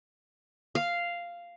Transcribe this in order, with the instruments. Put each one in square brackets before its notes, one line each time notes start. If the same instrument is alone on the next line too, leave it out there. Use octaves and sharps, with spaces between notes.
[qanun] F5